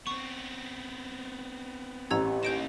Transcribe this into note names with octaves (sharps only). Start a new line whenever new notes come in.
B3 C4 C#6
A1 G4 A#5 E6 G#6
A#3 D#4 G6 D7 E7